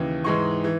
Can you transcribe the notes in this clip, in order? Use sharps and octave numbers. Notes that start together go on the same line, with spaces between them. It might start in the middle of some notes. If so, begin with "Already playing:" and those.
Already playing: D#2 C#3 E3
G#2 E3 G#3 D#4 C#6
E3